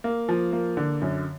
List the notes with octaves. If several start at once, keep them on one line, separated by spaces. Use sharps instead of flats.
A#3
F3
A#3
D3
F#2